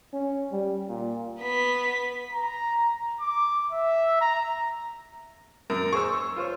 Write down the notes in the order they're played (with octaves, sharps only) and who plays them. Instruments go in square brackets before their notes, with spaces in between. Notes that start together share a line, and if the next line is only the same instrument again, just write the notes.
[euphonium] C#4
G3
A#2
[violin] B3 B6
[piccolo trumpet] A#5
D6
E5
A#5
[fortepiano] F#2 [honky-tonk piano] A#4
[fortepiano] G#4 C5 [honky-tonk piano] C#6 E6
[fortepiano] F4 C5 C#5